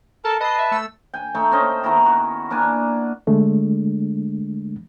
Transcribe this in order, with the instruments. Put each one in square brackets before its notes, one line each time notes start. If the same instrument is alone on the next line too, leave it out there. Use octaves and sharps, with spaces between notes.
[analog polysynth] A4 [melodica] A#4 A5
[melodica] B4 A5 [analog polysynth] D#5 C7
[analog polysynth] E5
A3 E6
[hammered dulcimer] G5 G#5
A3 D#4 G5 C#6
C4 C#4 D#5
D#3 B3 E4 A#5
F#4
A#3 D4 D5 G#5
[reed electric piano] D3 G#3 A3 D4